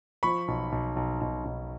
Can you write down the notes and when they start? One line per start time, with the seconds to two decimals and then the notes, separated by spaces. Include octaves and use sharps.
0.23 F3 B5 C#6
0.48 B1
0.72 B1
0.96 B1
1.21 B1
1.45 B1